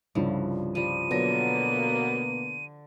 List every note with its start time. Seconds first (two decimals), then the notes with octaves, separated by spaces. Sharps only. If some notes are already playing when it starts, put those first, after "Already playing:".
0.15 C2 G2 C#3 F3
0.75 F3 G3 D#7
1.11 B2 D3 F#3 A#3 B3 A#6